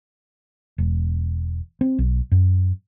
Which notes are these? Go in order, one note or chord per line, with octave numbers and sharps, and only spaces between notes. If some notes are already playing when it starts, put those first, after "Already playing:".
E1
C4
B1
F#2